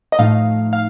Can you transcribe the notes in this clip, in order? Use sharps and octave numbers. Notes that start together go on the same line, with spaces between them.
D#5
A2 F3 A3 D#4 F5
F5